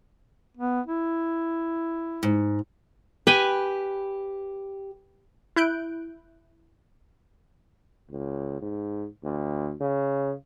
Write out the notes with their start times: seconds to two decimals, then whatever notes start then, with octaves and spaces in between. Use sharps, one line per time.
0.57 B3
0.87 E4
2.23 G#2
3.27 G4 B4 G5 G#5
5.56 E4 F#6 G6 D7
8.10 C#2
8.62 G#2
9.24 D2
9.80 C#3